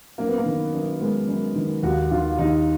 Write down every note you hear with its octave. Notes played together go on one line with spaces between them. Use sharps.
F#2 A#3
B3
A#3
D#3
F#2
G#3 B3
F#2
D#3
D#2 F#4
D#3 F4
D#2 D#4